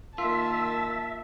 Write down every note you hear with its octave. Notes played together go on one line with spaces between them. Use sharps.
D#3 A#3 F4 E5 A5